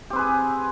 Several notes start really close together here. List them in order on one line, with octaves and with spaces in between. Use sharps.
G4 C4 B4 G#4